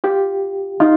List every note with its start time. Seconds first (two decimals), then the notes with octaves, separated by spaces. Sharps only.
0.04 F4 G4
0.80 D#4 F4